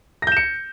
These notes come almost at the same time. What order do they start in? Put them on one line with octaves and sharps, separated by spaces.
A#6 G6 E7 C#7